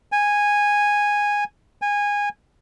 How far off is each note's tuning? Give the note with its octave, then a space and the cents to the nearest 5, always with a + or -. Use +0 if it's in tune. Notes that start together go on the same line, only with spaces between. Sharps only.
G#5 -10
G#5 -20